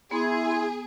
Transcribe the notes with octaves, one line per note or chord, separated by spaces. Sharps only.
B3 E4 G#4 C6 G#6